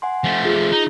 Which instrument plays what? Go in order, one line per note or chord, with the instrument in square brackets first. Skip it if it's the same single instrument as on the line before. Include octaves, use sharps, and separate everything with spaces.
[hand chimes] F#5 G#5 C6
[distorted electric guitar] F3 A3
[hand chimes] F4 G#4
[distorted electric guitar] D#4